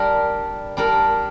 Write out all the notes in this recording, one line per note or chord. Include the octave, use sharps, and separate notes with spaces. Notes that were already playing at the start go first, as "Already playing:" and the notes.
Already playing: G3 D4 G4 A#4
G3 D4 G4 A#4